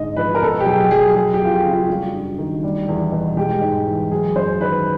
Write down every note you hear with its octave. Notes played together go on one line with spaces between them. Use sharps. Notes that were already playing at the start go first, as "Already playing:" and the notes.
Already playing: G#2 D3 G#3 D#5
F3 B4
A#4
B2 A4
G4
F#3 G#4
F#3 G#4
F#3 G#4
G4
F2 F4
F#4
C#3
F4
G3 F#4
G2
D#3
G3
E2
B2
G#3 G4
G#2
E3
F#3 G#4
F#2 C5
D#3 B4